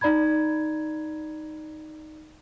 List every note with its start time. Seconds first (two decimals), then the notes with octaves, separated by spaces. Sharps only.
0.01 D#4 D5 A#5 B5 G#6